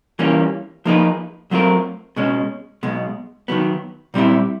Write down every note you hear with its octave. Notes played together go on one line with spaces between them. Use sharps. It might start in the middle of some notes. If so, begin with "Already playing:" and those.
E3 G3 A#3 C#4 F4
F3 A#3 D#4 G#4 B4
F#3 A3 C4 F4 A#4
B2 G#3 C#4
B1 B2 G#3
D#3 F#3 B3
A#2 G3 C4 E4